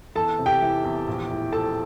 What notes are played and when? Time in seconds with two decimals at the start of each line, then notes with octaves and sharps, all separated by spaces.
0.15 E2 A4 A5
0.39 C3
0.46 G4 G5
0.62 E3
0.84 E2
1.07 A#1
1.30 A2
1.52 F3 A4 A5